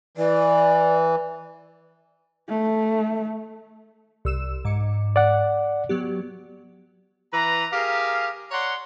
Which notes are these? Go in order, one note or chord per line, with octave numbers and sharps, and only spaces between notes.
E3 D5
A3
C2 E6 E7
G#2 D6 C#7
D5 F#5
F#3 B3 G4
E3 B4 A#5
G4 G#4 A#4 F5
C#5 D5 F#5 A#5 C6